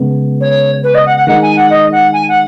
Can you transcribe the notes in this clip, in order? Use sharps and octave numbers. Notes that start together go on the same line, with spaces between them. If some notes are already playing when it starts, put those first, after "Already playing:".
Already playing: C#3 G#3 B3
C#5
B4
D#5
F#5
F#5
D#3 G#3 D#4 F#5
G#5
F#5
D#5
F#5
G#5
F#5